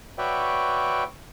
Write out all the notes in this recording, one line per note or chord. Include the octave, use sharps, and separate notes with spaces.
F#4 B4 C#5 D5 E5 G5